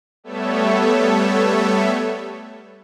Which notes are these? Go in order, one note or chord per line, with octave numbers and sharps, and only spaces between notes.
G3 A3 B3 A4 C#5 E5